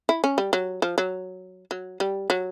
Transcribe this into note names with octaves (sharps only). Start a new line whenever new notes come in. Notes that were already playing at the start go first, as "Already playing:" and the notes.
E4
C#4
G3
F#3
F3
F#3
F#3
G3
F#3